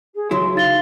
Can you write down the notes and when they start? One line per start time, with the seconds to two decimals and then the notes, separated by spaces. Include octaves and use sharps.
0.15 G#4
0.31 C#2 F#3 E4 C6
0.55 D#4 F5 A6 G7